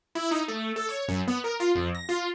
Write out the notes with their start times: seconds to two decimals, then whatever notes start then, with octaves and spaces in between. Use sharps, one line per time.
0.15 E4
0.31 D#4
0.48 A3
0.76 A4
0.89 C#5
1.08 F#2
1.27 B3
1.44 A#4
1.60 F4
1.75 F2
1.95 A#6
2.09 F4